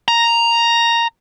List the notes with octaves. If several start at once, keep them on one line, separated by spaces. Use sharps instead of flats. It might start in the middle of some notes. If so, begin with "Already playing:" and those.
A#5